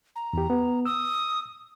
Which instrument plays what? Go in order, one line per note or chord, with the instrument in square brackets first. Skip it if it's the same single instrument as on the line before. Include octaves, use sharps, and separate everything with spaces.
[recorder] A#5
[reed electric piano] E2 G4
B3
[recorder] D#6 [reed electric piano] E6